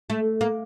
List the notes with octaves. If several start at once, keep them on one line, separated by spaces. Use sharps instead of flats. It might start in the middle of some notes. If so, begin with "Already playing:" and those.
A3
A#3